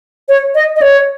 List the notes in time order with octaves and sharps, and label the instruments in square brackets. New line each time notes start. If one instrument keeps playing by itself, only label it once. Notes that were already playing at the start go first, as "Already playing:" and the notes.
[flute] C#5
D#5
D#5
C#5